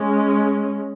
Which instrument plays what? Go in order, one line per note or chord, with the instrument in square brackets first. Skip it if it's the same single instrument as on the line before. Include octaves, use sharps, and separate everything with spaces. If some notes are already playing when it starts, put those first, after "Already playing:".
Already playing: [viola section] G#3 C#4